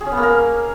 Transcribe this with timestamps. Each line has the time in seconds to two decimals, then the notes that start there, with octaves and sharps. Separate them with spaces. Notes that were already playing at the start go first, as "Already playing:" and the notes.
0.01 G#4
0.06 C#4
0.12 B3
0.17 A#3
0.23 A#4